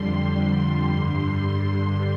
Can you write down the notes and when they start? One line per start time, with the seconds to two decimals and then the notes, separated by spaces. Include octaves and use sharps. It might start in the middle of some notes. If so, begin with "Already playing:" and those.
Already playing: F2 D3 G3 C6
0.85 G2 D3 G3